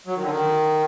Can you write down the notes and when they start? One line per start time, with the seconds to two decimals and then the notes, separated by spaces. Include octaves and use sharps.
0.07 F#3
0.15 D#3
0.22 D3
0.30 D#3